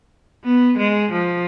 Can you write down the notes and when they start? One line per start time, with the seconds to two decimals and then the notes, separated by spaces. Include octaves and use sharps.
0.45 B3
0.78 G#3
1.12 F3